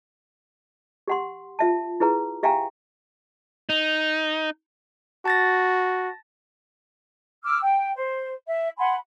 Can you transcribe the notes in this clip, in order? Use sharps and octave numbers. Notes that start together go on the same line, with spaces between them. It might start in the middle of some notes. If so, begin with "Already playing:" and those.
G4 F#5 C6
F4 E5 A5
E4 G#4 B4 A#5
G4 E5 F5 G5 G#5 A#5
D#4
F#4 A5 A6 A#6
D6 E6 F6
G5
C5
E5
F#5 G#5 B5 C6